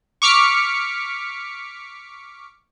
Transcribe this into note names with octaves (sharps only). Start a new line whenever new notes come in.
C#6 D6 F6 B6 C#7